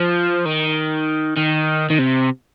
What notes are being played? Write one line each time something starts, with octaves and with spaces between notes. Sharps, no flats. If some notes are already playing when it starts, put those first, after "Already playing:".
Already playing: F3
D#3
D#3
D#3
C3